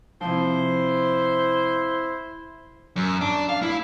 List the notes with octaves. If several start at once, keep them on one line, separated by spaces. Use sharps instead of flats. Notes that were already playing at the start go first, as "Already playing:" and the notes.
C3 F3 E4 C5
F#2
D4
F5
E4